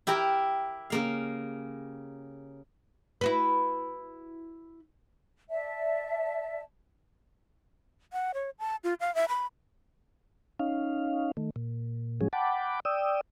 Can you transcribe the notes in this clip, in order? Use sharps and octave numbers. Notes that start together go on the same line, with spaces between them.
E4 G4 A#4 A#5
C#3 A#3 F5
E4 F#4 B4
D5 E5 A5
F#5
C#5
A5
F4
F5
E5
B5
C#4 D#4 F5
D#3 A3
A#2
A2 F3 F#3 G#3 C#4 G#4
F#5 G5 A5 B5 D6
D5 G5 D#6 E6